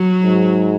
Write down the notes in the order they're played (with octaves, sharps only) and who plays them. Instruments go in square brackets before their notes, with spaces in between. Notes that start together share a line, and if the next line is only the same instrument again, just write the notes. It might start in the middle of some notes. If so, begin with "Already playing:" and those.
Already playing: [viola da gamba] F#3
[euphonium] G#2